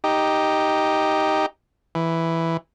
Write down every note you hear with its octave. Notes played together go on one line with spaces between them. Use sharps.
D#4 G4
E3